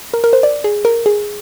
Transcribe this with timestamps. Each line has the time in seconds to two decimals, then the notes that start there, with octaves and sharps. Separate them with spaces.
0.14 A#4
0.24 A#4
0.33 C5
0.43 D5
0.64 G#4
0.85 A#4
1.06 G#4